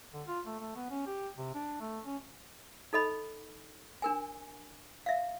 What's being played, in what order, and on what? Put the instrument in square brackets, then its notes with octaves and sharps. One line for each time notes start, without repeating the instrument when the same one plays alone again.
[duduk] D3
F4
A3
A3
B3
C#4
G4
C3
D4
A3
C#4
[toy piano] D#4 A4 D#5 B5
D4 A#4 G#5
E5 F5